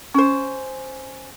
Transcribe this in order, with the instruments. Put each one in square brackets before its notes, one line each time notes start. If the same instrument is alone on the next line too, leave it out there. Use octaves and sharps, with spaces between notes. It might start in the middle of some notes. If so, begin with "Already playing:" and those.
[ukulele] C#4 C5